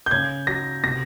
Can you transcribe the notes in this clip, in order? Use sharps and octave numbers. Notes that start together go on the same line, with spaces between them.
G6
C#3 G#6
F#3 A#6
C3 A#6